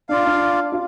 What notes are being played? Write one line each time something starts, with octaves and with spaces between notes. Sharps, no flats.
D4 F4 D5 F5
D4
F4